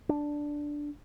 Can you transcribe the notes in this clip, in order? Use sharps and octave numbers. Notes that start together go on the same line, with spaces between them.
D4